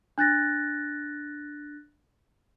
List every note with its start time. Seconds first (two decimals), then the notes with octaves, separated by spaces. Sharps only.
0.18 D4 F#6 A6 A#6